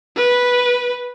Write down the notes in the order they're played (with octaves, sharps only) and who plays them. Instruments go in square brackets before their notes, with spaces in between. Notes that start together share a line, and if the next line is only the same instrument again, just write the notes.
[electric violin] B4